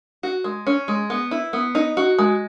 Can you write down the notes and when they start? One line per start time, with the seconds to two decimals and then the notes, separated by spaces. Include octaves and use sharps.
0.23 F#4
0.44 G#3
0.67 C#4
0.88 G#3
1.10 B3
1.31 E4
1.53 B3
1.75 D#4
1.97 F#4
2.18 G#3